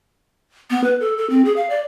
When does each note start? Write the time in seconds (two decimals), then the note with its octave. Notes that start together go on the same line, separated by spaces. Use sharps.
0.70 B3
0.84 B4
1.00 A4
1.17 A4
1.30 C4
1.45 G#4
1.56 F5
1.70 D5